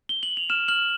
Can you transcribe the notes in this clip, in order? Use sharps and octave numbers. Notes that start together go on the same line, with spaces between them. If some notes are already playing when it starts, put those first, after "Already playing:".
G7
F#7
F7
F6 E7
F6 F#7